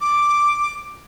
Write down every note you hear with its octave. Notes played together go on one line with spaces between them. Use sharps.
D6